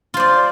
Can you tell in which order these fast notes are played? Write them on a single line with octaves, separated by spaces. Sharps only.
F4 C5 D5